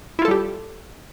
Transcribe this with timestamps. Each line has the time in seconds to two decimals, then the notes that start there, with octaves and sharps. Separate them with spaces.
0.19 E4
0.22 F4
0.25 A4
0.28 G3
0.31 G4